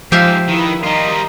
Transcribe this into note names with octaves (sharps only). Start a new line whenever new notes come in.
G#2 F3 G4 E5 F5
D#3 E4 B4
D#3 G3 F4 D#5 A#5